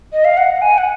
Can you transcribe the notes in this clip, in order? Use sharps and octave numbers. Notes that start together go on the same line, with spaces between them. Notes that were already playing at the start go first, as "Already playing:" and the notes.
D#5
F5
F#5
G#5
F#5